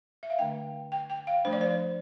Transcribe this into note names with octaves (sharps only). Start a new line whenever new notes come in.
E5
F5
D3 A3 D4 G5
G5
G5
F5
F3 A3 D4 C5
D5
C5